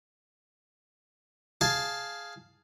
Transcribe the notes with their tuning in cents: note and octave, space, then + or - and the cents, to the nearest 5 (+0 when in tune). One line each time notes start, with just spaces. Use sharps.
G#4 +0 F5 +0 A5 +0